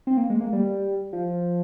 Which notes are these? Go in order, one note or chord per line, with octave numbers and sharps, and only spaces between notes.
C4
A#3
G#3
A#3
G3
F3